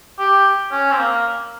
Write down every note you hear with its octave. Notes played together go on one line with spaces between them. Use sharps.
G4
C#4
C4
A#3